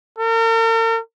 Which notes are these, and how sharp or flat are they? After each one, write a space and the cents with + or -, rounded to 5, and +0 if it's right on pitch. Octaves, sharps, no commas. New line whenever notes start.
A#4 -45